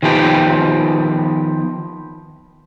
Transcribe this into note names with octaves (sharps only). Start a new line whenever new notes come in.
D#3 F3 B3 G4 G5